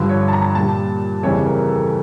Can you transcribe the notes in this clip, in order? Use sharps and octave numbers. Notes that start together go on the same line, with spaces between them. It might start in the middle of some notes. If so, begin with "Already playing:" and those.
Already playing: G2 D3 F3
C#5
A5
A#5
A#2 G3 A5
F2 C#3 E3 G3 C#5
A#4
A4